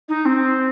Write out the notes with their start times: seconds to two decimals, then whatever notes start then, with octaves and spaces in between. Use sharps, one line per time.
0.09 D#4
0.25 C4